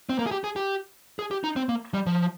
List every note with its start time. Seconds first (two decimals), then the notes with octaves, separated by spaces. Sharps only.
0.09 C4
0.19 A#3
0.27 G#4
0.31 G4
0.44 G#4
0.56 G4
1.19 G#4
1.31 G4
1.44 D#4
1.56 C4
1.69 A#3
1.94 G3
2.06 F3